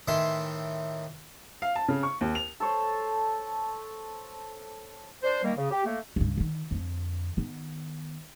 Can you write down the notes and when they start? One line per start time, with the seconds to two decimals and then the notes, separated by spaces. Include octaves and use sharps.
0.08 A2 D#3 E3 E5 C6
1.62 F5
1.76 A5
1.88 C#3
2.03 C#6
2.21 D#2
2.35 F7
2.60 A4 C5 C#5
5.23 D4 C5
5.43 D#3 G3 A#3
5.57 C#3
5.70 G4
5.85 A3 A#3
6.16 C#2 G2
6.37 D3 D#3
6.71 F2 D3
7.37 D#3 B3